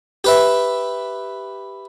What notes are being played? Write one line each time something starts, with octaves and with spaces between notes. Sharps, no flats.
G4 B4 E5